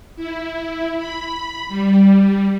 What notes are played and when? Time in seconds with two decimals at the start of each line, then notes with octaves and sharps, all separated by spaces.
0.16 E4
0.98 B5
1.68 G3